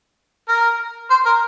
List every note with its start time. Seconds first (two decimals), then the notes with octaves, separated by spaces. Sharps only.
0.48 A#4
1.10 C5
1.26 A#4